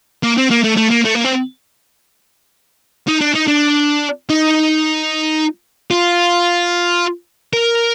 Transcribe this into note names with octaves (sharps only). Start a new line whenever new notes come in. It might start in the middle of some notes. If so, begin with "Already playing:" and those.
A#3
C4
A#3
A3
A3
A#3
A3
A#3
C4
D#4
D4
D#4
D4
D#4
F4
A#4